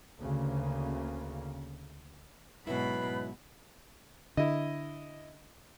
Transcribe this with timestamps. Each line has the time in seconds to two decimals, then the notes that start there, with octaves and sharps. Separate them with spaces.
0.20 D2 C#3 A#3
2.67 G#2 B2 F#3 C#4 E4 B4 B5
4.37 D3 E4 D#5